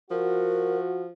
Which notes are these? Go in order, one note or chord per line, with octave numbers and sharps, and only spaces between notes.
F3 F#4 A#4